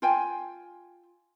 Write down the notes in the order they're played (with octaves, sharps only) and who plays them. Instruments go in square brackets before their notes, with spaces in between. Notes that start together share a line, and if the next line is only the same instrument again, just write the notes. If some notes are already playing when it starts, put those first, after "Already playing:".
[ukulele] F4 G5 G#5